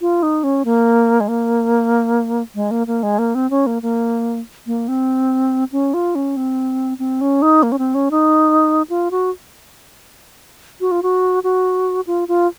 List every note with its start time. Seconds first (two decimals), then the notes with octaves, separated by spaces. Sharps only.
0.01 F4
0.23 D#4
0.44 C#4
0.65 A#3
1.20 G#3
1.28 A#3
2.55 G#3
2.71 A#3
2.87 A#3
3.03 G#3
3.19 A#3
3.35 C4
3.50 C#4
3.67 A#3
3.82 A#3
4.67 A#3
4.88 C4
5.72 C#4
5.94 F4
6.15 C#4
6.37 C4
6.99 C4
7.21 C#4
7.42 D#4
7.63 A#3
7.72 C#4
7.79 C4
7.95 C#4
8.11 D#4
8.90 F4
9.11 F#4
10.81 F#4
10.91 F4
11.03 F#4
11.44 F#4
12.07 F4
12.28 F4